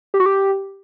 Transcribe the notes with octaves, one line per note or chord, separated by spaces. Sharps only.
G4
F#4
G4